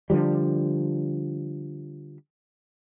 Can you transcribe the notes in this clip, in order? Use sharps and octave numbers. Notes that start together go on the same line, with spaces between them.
D3 D#3 F3 G3